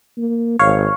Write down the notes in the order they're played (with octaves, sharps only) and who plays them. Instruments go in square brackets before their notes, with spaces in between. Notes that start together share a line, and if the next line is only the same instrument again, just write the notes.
[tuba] A#3
[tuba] G#1 [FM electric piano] C#5 F5